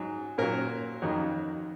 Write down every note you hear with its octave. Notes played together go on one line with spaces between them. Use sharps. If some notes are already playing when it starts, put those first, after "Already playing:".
Already playing: G#2 F#3
A#2 F#3 A#4
F2 D#3 F#3